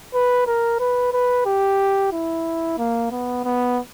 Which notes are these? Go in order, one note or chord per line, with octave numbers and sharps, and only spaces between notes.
B4
A#4
B4
B4
G4
E4
A#3
B3
B3